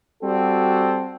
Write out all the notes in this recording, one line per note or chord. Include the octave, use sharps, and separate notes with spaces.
G3 C4 F#4 A4